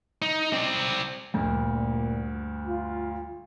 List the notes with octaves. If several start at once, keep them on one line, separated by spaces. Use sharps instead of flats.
D#4
C4 D5
D2 G2 A#2
F4